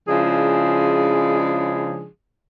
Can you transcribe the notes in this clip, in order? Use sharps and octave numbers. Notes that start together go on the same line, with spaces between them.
C#3 F3 G#3 D4 E4 G#4